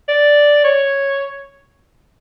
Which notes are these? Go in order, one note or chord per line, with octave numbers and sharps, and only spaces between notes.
D5
C#5